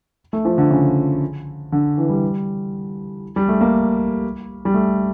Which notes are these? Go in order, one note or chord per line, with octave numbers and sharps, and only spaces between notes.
A3
F3
D3
C#3
D3
E3
G3
G3
A3
A#3
G3
A3